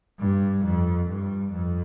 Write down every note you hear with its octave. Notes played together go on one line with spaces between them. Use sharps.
G2
F2
G2
F2